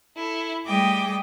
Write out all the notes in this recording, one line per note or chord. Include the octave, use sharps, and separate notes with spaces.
E4 A4
G3 A3 G#4 D#5 G5 D6